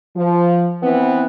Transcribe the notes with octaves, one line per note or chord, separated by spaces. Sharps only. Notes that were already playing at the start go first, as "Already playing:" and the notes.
F3
E3 B3 C4